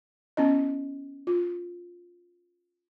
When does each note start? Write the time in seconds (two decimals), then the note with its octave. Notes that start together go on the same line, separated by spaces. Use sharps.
0.37 B3 C#4 E4 D#5
1.27 F4